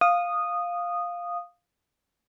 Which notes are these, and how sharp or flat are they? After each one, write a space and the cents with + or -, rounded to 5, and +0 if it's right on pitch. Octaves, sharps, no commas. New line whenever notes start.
F5 +5 D#6 -10